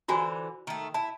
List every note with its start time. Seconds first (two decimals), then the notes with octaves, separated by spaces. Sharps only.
0.08 D3 E3 F4 F#4 C5 G#5
0.67 D#3 A3
0.94 E4 A5